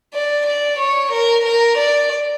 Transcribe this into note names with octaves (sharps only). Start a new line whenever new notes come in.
D5
D5
C#5
A#4
A#4
D5